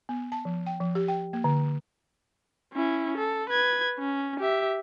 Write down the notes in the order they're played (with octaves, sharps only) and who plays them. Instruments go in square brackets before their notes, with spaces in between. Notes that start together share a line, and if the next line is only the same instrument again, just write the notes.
[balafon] B3
A5
F3
G5
F3
G4
G5
A#3
D3
[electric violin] C#4 E4
A4
B4 G#6
C#4
G4 E5